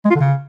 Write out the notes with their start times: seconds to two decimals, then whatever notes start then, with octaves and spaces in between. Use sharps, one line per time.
0.05 G#3
0.10 F4
0.15 D3
0.20 C#3